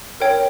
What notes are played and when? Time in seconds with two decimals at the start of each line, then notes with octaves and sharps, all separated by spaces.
0.20 A#4 C#5 G5